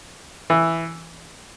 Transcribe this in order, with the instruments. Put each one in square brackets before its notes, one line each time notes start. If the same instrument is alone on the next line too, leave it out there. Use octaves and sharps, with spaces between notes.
[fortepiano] E3